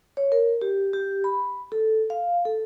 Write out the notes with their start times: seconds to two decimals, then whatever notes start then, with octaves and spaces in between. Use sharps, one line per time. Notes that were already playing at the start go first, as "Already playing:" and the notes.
0.17 C#5
0.32 A#4
0.61 G4
0.93 G4
1.24 B5
1.72 A4
2.10 F5
2.45 A4